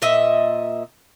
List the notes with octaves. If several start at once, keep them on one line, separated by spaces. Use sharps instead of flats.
A#2 D#5 E5